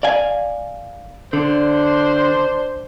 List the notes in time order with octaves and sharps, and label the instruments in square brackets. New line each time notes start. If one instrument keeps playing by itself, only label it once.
[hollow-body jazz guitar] D5 F5 G#5
[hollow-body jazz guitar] D3 [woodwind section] D4 C5